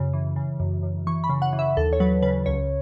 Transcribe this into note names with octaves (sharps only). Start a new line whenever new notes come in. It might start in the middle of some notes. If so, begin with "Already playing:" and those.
Already playing: F#2 C#3
E3
C#3
F#2
F#2
E3 C#6
B5
C#3
F#5
E3
E5
D#2 A4
C#5
F#3 B4
C#3 B4
C#2 C#5